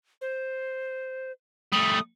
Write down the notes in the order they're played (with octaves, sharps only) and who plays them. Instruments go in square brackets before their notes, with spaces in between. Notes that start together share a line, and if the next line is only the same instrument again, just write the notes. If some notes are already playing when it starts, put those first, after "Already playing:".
[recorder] C5
[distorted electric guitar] G3 A3 [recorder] D#6